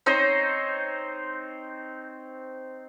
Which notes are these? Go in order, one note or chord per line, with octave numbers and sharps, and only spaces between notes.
C4 D#4 C5 C#5